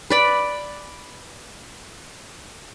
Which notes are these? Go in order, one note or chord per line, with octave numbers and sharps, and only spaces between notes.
B4 D5 B5